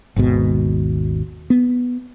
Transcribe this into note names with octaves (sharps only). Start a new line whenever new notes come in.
G#1 D#2 G#2 B2
B3